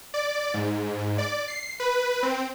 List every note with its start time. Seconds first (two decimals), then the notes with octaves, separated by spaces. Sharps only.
0.14 D5
0.54 G#2
1.18 D5
1.48 C7
1.80 B4
2.23 C4